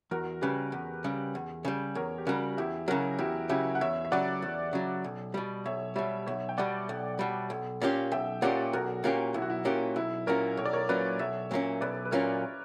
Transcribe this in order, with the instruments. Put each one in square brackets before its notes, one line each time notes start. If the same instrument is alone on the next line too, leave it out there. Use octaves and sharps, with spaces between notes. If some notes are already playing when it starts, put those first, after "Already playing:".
[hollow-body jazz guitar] E2 [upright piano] F#4 A#4
[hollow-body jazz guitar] C#3 G3 [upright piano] G4 B4
[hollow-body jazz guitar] E2
C#3 G3
E2
C#3 G3
[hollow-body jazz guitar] E2 [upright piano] A#4 C#5
[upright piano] G4
[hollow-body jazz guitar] C#3 G3 [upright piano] F#4 A#4
[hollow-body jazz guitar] E2 [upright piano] E4 G4
[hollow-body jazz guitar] C#3 F#3 [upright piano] F#4 A#4
[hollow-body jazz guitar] E2 [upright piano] E4 G4
[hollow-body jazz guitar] C#3 F#3 [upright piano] E4 G4
[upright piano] F#5
[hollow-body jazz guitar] E2 [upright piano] C#5 E5
[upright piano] E5
[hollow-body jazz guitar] C#3 F#3 [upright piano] D5 F#5
[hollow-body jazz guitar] E2
C#3 F#3
B1
B2 G3
[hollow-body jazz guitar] B1 [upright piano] C#5 E5
[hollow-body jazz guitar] B2 G3 [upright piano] C#5 E5
[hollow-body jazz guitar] B1 [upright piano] C#5 E5
[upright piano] G5
[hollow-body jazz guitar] B2 G3 [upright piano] D5 F#5
[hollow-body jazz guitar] B1
B2 G3
B1
A#2 A#3 C#4 G4
[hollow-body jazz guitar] B1 [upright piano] E5 G5
[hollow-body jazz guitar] A#2 A#3 C#4 G4 [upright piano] D5 F#5
[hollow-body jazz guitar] B1 [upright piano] F#4 A#4
[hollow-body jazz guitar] A#2 A#3 C#4 G4 [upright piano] F#4
[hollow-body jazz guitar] B1 [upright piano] E4
[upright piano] F#4
E4
[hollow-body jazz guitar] A#2 A#3 C#4 G4 [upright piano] F#4
[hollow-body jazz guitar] B1 [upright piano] E4
[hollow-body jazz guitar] A#2 F#3 A#3 C#4 [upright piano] A#4 C#5
[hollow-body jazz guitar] B1 [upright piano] C#5
[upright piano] D5
A#4 C#5
[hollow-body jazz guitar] A#2 F#3 A#3 C#4 [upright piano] B4 D5
[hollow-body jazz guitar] B1 [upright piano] C#5 E5
[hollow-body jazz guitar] A#2 F#3 A#3 C#4
[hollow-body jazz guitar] B1 [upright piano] B4 D5
[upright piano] B4
[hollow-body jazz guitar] A#2 F#3 A#3 C#4 [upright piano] A#4 C#5